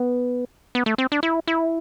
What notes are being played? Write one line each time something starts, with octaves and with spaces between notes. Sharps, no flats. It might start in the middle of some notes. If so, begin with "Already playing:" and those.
Already playing: B3
B3
A3
C4
D4
E4
E4